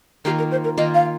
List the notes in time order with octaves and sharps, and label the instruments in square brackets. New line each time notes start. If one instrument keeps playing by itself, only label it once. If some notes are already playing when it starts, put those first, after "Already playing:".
[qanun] D#3 A#3 F4 [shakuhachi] G4
[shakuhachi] A#4
C5
A#4
[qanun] D#3 A#3 F4 [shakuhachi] D#5
[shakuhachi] F5